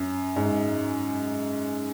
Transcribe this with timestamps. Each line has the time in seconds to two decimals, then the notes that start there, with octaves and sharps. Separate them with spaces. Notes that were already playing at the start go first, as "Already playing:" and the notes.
Already playing: F#2
0.36 G#2